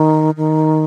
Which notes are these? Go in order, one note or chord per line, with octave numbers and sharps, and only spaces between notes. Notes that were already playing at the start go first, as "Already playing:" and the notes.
Already playing: D#3
D#3